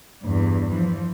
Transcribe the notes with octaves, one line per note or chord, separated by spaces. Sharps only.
E2 G2
E3 F3